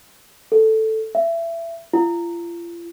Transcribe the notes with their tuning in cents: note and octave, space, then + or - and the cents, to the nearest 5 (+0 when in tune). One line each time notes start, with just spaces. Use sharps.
A4 +0
E5 +25
F4 -40